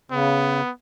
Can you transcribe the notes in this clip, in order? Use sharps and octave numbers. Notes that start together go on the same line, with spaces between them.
C#3 B3